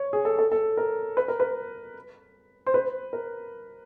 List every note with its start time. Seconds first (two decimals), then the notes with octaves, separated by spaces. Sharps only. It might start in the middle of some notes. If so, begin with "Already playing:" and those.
Already playing: C#5
0.13 G#4
0.25 A4
0.39 A4
0.52 A4
0.77 A#4
1.17 B4
1.28 A#4
1.40 B4
2.66 C5
2.74 B4
3.13 A#4